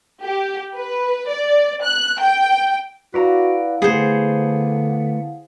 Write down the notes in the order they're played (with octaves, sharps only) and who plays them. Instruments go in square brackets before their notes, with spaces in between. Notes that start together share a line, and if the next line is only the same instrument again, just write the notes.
[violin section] G4
B4
D5
F#6
G5
[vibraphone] E4 F5 F#5 [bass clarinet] F#4 [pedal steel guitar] B4 D5 A#5
[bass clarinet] D3 [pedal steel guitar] A3 B3 [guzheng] G#4 C5